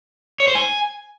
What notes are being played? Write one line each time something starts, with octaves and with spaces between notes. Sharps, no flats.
C#5
C5
G#5